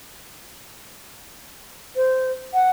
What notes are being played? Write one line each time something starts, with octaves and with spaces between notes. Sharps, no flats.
C5
F#5